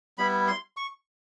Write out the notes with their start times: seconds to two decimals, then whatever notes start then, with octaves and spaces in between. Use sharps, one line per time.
0.18 G3 B3 E4 B5
0.48 C6
0.77 C#6